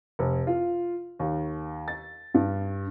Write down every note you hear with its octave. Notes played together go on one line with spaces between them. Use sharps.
F1
F4
D#2
A6
G2